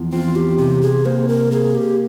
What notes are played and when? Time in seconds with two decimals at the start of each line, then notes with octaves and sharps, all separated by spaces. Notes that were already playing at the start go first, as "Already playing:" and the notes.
Already playing: E2 F3
0.13 C4 F4
0.36 G4
0.58 C3 G4
0.82 G#4
1.06 A#3 C5
1.28 A#4
1.51 A#3 G#4
1.75 G4